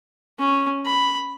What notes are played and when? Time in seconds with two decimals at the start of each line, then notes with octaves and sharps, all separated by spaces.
0.39 C#4
0.86 B5